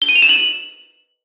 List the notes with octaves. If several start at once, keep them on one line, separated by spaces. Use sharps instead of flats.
G7
D#7
F7
E7
F#7